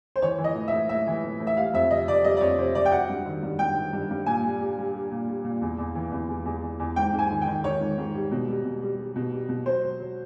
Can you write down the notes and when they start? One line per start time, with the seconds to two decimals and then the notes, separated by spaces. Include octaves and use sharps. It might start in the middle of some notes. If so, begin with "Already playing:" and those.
0.16 C5
0.22 E3 C#5
0.39 E3
0.44 D#5
0.55 A2
0.68 E5
0.72 A2
0.89 A2 E5
1.07 E3
1.24 A2
1.40 A2
1.47 E5
1.57 G3 F5
1.74 F2 E5
1.90 C3 D#5
2.07 C3 D5
2.24 G3 D#5
2.37 D5
2.41 F2 C#5
2.58 C3 C5
2.75 C3 D5
2.85 G5
2.92 F#3 F#5
3.09 G2
3.26 D#3
3.43 G2
3.59 G2 G5
3.76 D#3
3.93 G2
4.10 G2
4.26 A#2 G#5
4.44 G3
4.61 G3
4.78 G3
4.94 G3
5.11 A#2
5.28 G3
5.45 A#2
5.62 E2
5.79 E2
5.95 E3
6.12 E2
6.29 E2
6.46 E2
6.62 E2
6.79 E2
6.96 G#2 G5
7.13 G#2
7.19 G#5
7.31 D#3
7.42 G5
7.47 D#3
7.64 D#3 C#5
7.81 G#2
7.98 G#2
8.15 G3
8.31 B2
8.48 G3
8.65 B2
8.82 G3
8.99 G3
9.16 B2
9.33 G3
9.49 B2
9.66 F#3 C5
9.83 F#3
10.00 F#3